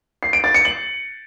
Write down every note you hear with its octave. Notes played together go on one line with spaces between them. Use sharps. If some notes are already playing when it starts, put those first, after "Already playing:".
C7
D7
A6
C#7
F#7